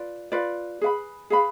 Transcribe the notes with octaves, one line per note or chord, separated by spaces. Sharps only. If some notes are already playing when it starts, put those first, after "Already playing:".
Already playing: F4 B4 D5
F4 B4 D5
G#4 B4 F5 B5
G#4 B4 F5 B5